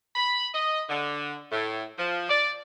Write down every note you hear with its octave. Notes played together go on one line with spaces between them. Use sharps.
B5
D#5
D3
A2
F3
D5